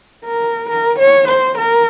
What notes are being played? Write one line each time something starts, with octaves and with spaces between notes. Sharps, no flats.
A#4
A#4
C#5
C5
A#4